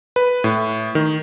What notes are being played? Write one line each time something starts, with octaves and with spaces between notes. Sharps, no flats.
B4
A2
D#3